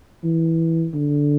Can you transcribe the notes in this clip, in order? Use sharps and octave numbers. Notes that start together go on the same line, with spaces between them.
E3
D3